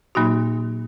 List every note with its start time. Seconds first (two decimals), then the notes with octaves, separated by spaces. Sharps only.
0.15 A#2 F#3 A#3 D#4 F#4